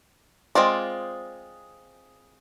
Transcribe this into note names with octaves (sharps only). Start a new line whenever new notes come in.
G#3 C4 F4 D5